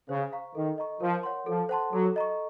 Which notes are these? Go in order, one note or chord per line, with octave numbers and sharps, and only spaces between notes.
C#3 C5
F5 A#5 C#6
D#3 A4
D#5 A#5 C#6
F3 A#4
C#5 F#5 C6
F3 A4
C5 F#5 A5 C6
F#3 A4
D#5 A#5 C#6